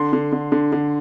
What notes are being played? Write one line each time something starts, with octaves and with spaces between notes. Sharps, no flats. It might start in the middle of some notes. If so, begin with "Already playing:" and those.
Already playing: D3 C6
D3
D3
D3
D3